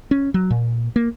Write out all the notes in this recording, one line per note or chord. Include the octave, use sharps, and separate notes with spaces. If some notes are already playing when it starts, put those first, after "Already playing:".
C#4
F#3
A#2
A#3